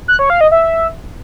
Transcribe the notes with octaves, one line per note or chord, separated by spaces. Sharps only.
F#6
C#5
F5
D#5
E5